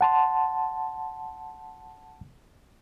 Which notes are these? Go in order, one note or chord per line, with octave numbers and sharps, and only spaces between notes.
F#5 A5 C6